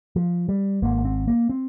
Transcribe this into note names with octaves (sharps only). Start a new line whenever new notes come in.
F3
G3
G#1 G#2 A#3
C4
A#3
C4